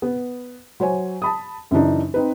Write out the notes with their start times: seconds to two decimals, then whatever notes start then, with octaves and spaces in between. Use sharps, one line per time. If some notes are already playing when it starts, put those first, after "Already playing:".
0.02 B3
0.80 F#3 C5 C#5 G#5
1.22 A5 B5 D#6
1.71 F#2 C#3 E3 D4 D#4
2.14 C4 D#4 B4